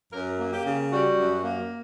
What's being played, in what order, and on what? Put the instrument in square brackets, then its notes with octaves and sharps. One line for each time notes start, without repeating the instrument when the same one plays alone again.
[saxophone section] F#2 A#4
A#3
G4
C#3
G3 F#4
F#2
A#3